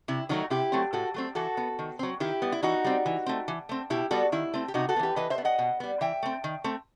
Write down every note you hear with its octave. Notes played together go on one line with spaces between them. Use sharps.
C3 E4
D#3 F#3 A3 D#4 F#4
C3 E4 G4
F#3 A3 C4
A2 F#4 A4
F#3 A3 C4
E3 F#4 A4
B3
D#3
F#3 C4
D#3 E4 G4
G3 B3
E4
E3 D#4 F#4
G3 C4
E3
A3 C4
E3
A3 C4
B2 E4 G4
G3 B3 F#4 A4
D#3 E4
A3 C4
G4
C3 D#4 F#4
F#4 A4
B3
E3 G4 B4
E3 B4 D#5
C5 E5
B3
D#5 F#5
B2
G3 B3
E3 E5 G5
A3 C4
D#3
A3 C4